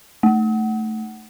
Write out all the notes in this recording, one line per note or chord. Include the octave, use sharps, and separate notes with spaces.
A3